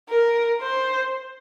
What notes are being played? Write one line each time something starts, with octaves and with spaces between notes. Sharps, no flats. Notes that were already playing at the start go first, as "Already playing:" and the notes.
A#4
C5